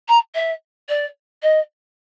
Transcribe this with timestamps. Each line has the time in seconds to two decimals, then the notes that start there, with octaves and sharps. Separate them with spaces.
0.08 A#5
0.35 E5
0.89 D5
1.42 D#5